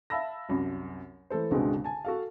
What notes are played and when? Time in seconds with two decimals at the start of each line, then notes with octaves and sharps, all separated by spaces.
0.10 E5 F5 A5 B5 E6 A#6
0.49 C2 F#2 B5
1.30 E3 A3 A4 C5
1.51 G1 C#2 B2 D3 G#3 C4
1.84 G#5 A5
2.05 F#4 A4 F5